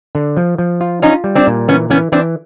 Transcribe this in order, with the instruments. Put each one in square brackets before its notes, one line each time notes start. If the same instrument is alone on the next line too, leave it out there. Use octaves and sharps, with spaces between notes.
[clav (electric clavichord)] D3
F3
F3
F4
[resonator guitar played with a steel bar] C#4 D#4 [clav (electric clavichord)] F4
[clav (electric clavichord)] G3
[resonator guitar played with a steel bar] C4 D4
[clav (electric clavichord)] A#2
[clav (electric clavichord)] E3 [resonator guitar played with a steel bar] B3 C#4
[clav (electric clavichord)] E3 [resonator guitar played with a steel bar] B3 C#4
[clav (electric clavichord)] E3 [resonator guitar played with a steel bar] C4 D4